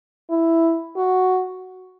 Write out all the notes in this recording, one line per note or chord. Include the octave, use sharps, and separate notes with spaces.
E4
F#4